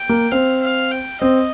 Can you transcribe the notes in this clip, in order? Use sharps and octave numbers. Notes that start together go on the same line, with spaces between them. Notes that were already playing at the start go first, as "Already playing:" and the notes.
Already playing: G5
A#3
C4 F5
F5
G5
C4 D#5